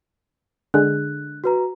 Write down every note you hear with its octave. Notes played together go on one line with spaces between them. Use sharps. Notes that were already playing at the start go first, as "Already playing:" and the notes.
D3 G#3 F#6
F#4 B4 A#5